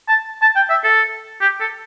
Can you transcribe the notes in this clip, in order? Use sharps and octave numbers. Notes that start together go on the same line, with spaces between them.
A5
A5
G5
E5
A4
G4
A4